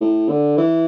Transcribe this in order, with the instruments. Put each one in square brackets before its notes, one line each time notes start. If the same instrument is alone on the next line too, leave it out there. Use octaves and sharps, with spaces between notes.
[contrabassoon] A2
D3
E3